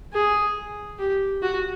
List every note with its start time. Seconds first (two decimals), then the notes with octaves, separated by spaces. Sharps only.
0.14 G#4
0.99 G4
1.42 F#4